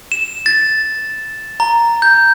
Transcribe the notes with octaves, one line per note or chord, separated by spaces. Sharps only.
E7
A6
A#5
G6